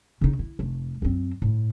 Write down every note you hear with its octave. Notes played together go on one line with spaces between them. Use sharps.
C#3 D#4
E4
F1
F#2 C4
A2